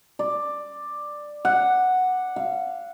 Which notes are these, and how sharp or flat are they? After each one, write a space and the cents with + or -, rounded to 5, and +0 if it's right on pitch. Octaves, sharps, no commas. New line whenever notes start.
D5 +10
F#5 -5
F5 -25